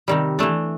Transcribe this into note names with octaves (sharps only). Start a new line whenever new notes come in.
C3 D#3 G3
E3 A3 D4